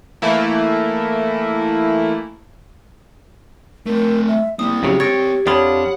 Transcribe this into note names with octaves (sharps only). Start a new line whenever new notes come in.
E3 A3 A#3 E4
A3 C4 A#4
E5
A#3 C4 E4 D#6
F#2 C#3 F#3 G4
C2 C4 C#5 A6 A#6 D7
F2 D4 F4 C#5 F#5 B5 D#6